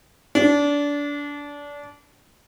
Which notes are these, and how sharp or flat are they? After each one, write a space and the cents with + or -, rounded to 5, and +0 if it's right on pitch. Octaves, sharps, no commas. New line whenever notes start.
D4 -25